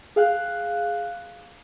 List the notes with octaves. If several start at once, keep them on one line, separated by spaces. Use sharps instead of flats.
G#4 F5 G5 F#6